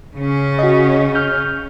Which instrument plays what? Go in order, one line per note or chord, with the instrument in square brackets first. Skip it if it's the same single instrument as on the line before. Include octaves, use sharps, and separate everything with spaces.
[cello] C#3 C#4
[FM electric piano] F#4 D#5
F6 G6